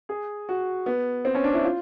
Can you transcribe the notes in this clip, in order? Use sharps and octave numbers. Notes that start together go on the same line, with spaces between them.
G#4
F#4
B3
C4
C#4
D4
E4
F4